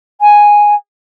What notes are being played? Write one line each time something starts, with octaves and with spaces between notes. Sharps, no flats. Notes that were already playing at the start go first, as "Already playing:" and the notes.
G#5